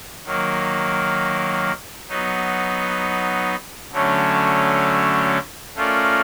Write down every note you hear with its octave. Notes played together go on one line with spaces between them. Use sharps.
D#3 F#3 A#3
F#3 B3 D#4
D3 F#3 A3 C#4
A3 C#4 F4 A#4 D5